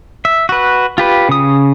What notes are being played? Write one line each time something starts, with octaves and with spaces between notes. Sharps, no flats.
E5
F#4 B4
F4 G4 B4
C#3 D#6